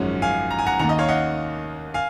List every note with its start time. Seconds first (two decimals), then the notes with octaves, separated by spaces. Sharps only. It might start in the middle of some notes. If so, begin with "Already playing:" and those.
Already playing: G#1 F#2 F3 G#3 C#4
0.22 F5 G#5
0.51 A#5
0.59 G#5
0.66 F#5 A#5
0.79 D#2 D#3 A#3 F#5 A#5
0.89 D#5
0.99 C#5 F5
1.09 D#5 F#5
1.94 F5 G#5